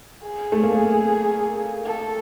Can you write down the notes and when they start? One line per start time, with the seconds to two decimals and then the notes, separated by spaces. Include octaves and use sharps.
0.23 G#4
0.52 A3
0.63 A#3
1.85 A4